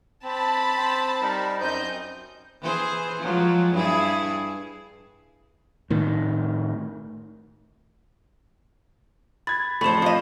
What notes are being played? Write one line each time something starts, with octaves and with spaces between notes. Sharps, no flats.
C4 A5 B5
C4 C5
G3 D#4 A#4
F#2 C4 D#4 D#5 G6
E3 G#4 C5
F3 F#3 G#3
G2 E4 G#4
A2 D#3
B5 G#6 A6
A1 F2 A3 C5 B5 E7
F3 F4 D#5